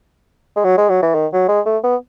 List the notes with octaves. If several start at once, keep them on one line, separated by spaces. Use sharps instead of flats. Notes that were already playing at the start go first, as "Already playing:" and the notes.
G#3
F#3
G#3
F#3
E3
D#3
F#3
G#3
A3
B3